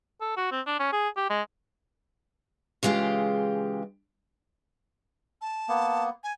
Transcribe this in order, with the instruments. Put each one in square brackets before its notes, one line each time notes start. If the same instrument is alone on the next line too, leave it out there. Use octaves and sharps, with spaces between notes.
[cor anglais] A4
F#4
C4
D4
C#4
G#4
G4
G#3
[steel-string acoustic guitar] C#3 E3 G#3 F4 G4
[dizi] A5
[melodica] A#3 B3
[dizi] G#5